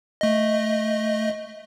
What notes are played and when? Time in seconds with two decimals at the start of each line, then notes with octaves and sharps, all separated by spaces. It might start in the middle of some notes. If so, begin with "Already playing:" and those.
0.21 A3 D#5